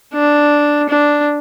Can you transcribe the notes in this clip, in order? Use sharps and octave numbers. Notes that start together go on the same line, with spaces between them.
D4
D4